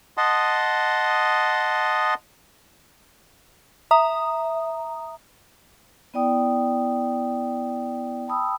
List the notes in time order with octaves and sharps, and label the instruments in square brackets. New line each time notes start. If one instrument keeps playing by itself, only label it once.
[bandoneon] D#5 F#5 A5 C6 D#6
[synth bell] E5 A#5 D#6
[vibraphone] B3 E4 D5 G5 D#6
G5 A5 B5 D#6 E6